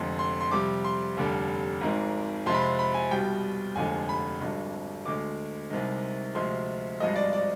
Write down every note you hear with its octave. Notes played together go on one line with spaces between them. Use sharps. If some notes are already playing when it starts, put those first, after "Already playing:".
Already playing: F1 F2 D3 G#3 C6
C6
C6
F2 C3 G3 D6
C6
F1 D#2 D3 G3
G#1 G#2 D#3 G#3
F2 C3 F3 G#3 C6
B5
C6
B5
G#5
C2 B2 G3 G5
F1 D#2 D3 F3 G#3 G#5
B5
G#1 G2 D3 G#3
D2 D3 G#3 D6
C2 C3 D#3 G#3
D2 C3 F3 G#3 C6
G#1 G2 F3 G#3 D#5
D5
D5